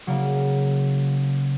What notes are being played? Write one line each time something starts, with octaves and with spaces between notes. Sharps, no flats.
C#3 F#3 A#3